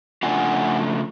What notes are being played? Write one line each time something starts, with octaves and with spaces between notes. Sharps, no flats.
C#3 F3 A3 D4 F4 F#5 G#5